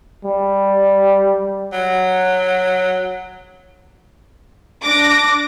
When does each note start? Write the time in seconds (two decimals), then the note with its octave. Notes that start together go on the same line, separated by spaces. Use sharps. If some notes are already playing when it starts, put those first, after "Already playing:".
0.25 G3
1.73 F#3
4.83 D4 D6 A#6